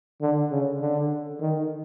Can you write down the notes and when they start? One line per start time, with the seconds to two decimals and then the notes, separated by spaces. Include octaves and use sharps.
0.21 D3
0.51 C#3
0.81 D3
1.40 D#3